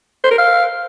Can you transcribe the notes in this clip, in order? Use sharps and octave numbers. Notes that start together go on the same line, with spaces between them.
C5
A#4
F5